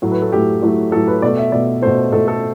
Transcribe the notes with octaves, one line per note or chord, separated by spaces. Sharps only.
A2 F#3 A3
B4
A4
A2 F#3 A3 G4
A2 F#3 A3
A2 F#3 A3 A4
B4
B2 A3 D5
E5
B2 A3 D5
B2 A3 C5
B2 A3 A4
A4